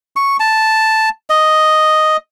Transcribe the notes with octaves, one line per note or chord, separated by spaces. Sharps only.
C#6
A5
D#5